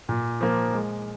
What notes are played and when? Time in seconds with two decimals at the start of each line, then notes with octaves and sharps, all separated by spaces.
0.09 A#2
0.41 F3 A#3
0.73 G#3